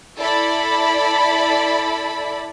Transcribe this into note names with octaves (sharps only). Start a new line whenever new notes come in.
E4 A4 D5 B5